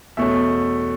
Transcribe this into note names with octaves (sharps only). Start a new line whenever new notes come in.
E2 B2 A3 C#4 E5